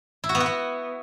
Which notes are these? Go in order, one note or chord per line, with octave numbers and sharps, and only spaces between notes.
E4
F#4
B3
F#4
B3